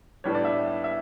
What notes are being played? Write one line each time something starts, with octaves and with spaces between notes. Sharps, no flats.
A2 G3 B3 D4 C#5
D5
E5
E5